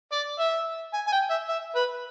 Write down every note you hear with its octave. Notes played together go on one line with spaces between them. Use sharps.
D5
E5
G#5
G#5
G5
E5
E5
B4